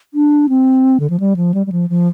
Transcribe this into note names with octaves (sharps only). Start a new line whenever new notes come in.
D4
C4
D3
F3
G3
F3
G3
G3
F3
F3